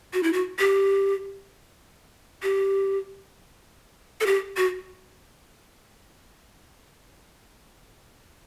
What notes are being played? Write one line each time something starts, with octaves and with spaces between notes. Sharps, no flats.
F#4
E4
F#4
G4
G4
A4
G4
F#4